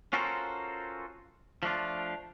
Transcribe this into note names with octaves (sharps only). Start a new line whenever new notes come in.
C#4 F4 F#4 A4 A#4 C5
F3 A3 D4 F4